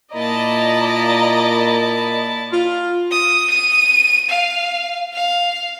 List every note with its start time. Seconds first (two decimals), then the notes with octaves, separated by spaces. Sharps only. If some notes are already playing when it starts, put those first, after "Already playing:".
0.14 A#2 A#3 E4 D5 D#5 A5 A#5
2.52 F4
3.11 D#6
3.50 D#7
4.30 F5
5.14 F5